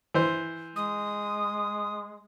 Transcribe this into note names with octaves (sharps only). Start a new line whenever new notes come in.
E3 C5
G#3 D#6